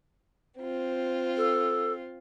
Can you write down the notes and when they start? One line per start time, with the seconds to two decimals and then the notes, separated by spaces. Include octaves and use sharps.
0.58 C4 F4
1.37 A4